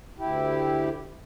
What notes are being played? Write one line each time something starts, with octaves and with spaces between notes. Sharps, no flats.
D2 E4 G4